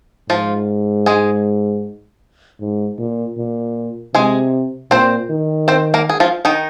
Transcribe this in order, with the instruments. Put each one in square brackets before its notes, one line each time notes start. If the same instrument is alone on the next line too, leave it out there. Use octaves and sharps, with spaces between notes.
[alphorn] G#2 [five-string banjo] F3 F4
[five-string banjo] G#3 G#4
[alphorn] G#2
A#2
A#2
[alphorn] C3 [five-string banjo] G#3 G#4
[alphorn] A#2 [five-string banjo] C4 C5
[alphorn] D#3
[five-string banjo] C4 C5
A#3 A#4
G#4
F3 F4
D#3 D#4